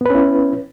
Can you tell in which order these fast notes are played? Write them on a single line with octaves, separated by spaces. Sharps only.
B3 B4 C#4 E4